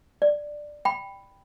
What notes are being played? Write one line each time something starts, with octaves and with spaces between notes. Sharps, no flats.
D5
G5 B5